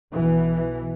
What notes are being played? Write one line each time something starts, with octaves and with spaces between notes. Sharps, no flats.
B1 B2 E3